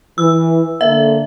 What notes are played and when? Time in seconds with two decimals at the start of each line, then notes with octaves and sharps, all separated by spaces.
0.18 E3 E6
0.81 D3 A#3 E5